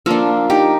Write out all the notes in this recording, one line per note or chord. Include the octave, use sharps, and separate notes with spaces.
F3 A#3 D4 F4 A4
D#4 G4